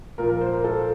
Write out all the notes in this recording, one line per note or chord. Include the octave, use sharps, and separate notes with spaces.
A#2 F3 A#4
A#4
C5
A#4
A4